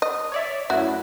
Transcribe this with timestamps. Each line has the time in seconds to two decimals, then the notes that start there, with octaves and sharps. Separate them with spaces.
0.02 D#5
0.32 C#5 D5 E5
0.70 F#2 A3 E4 F#4